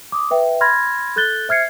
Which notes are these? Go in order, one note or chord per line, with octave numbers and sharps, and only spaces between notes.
D6 D#6
B4 E5 G5
B5 C6 F6 G#6 A#6
A4 F#6 G6 A6 G7
C5 E5 F6 G#6 C7 C#7